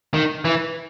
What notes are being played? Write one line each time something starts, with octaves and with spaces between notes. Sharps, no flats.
D#3
E3